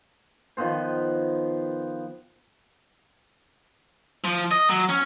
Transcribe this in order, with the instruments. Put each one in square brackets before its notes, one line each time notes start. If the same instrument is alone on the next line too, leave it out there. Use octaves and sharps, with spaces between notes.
[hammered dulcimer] D#3 F3 B3 C5
[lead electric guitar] F3
D#5
F#3
C#4